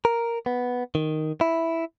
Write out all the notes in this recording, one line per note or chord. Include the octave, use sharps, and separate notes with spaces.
A#4
B3
D#3
E4